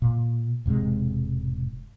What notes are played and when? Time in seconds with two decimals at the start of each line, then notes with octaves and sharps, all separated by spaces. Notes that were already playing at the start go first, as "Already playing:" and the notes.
0.02 A#2
0.66 E1 G#2 C3 G#3